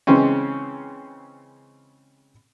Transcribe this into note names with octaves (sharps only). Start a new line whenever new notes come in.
C#3 E3 G#3 C4 C#4